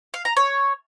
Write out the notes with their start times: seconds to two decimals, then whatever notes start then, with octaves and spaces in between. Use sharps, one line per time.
0.14 F5
0.25 A#5
0.37 C#5